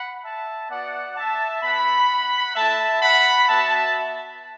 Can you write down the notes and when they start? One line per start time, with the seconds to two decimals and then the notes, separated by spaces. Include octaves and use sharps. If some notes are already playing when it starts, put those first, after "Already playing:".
Already playing: F#5 B5
0.24 E5 A5
0.70 B3 F#4 D5 F#5
1.17 E5 A5
1.63 B3 E4 F#5 B5
2.56 A3 E4 E5 A5
3.02 F#5 B5
3.48 B3 F#4 E5 A5